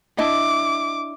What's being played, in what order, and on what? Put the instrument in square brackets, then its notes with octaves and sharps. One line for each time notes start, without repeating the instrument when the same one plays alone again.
[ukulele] D4 E4 D#5 [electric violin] D6